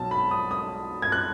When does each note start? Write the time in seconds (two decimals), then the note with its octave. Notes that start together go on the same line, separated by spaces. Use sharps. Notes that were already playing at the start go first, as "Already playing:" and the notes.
Already playing: B1 B2 F#3 A5
0.11 B5
0.31 D#6
0.51 D#6
1.02 G#6
1.12 F#6